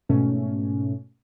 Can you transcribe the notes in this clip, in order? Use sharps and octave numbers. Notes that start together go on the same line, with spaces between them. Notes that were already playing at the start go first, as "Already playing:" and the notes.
G#2 B2 A3 C#4